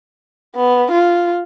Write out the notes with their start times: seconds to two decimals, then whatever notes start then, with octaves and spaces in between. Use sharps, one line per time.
0.55 B3
0.91 F4